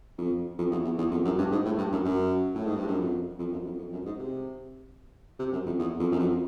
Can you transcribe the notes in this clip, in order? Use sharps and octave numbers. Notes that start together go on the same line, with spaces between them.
F2
F2
E2
E2
E2
F2
F#2
G2
G#2
A2
G2
F#2
F#2
A2
G#2
G2
F#2
F2
F2
F#2
F2
F2
F#2
G#2
C3
C3
F#2
F2
E2
F2
F#2
F2